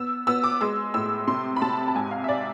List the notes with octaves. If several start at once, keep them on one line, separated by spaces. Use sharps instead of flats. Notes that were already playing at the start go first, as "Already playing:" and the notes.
Already playing: B3 E6
B3 E6
D6
G#3 E6
A2 E6
C3 C6
B5
C3 A5
A5
G#2 G#5
F5
E5
D5